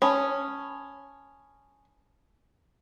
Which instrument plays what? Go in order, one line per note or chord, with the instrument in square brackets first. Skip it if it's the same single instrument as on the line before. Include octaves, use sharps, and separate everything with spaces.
[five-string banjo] C#4 [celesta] A5 B5 D#6